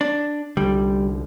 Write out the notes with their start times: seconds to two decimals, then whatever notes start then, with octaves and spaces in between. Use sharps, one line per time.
0.01 D4
0.57 C2 D3 G3